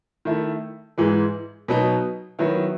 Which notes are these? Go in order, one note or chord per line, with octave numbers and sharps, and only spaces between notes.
D#3 A3 E4
G#2 E3 G#3
B2 F#3 B3 D#4
D#3 F#3 B3 E4